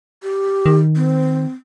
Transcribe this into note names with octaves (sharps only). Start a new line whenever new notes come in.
G4
D#3
C4